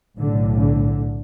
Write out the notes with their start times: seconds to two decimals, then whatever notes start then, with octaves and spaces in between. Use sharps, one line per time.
0.18 B1 A2 D3
0.57 D3